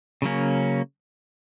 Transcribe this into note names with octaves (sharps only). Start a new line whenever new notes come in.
C#3 F#3 A#3 C#4